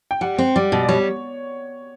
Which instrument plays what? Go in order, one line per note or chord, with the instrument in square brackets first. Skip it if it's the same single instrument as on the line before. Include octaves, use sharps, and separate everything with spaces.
[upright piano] G5
[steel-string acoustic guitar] G3 [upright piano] F#5
[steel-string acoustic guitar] C4
[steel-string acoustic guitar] G3 [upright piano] D5
[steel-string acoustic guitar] B2
[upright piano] D5
[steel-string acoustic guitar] G3 [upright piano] C#5